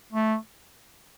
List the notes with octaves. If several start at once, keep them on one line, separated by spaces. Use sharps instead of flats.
A3